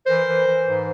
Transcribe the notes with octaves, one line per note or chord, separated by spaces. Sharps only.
E3 A#4 C5
E3
E3
G#2